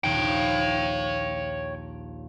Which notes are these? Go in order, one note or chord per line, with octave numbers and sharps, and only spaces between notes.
A#1 D#2 C#5 G5